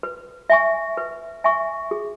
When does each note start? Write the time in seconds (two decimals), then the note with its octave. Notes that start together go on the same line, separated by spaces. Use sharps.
0.03 B4
0.50 E5 G#5 C#6
0.97 B4
1.44 E5 G#5 C#6
1.91 G#4